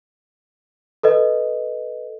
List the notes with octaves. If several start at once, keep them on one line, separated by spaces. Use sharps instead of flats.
A4 B4 D#5